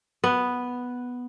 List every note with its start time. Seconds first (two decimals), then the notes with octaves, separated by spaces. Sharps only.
0.24 B3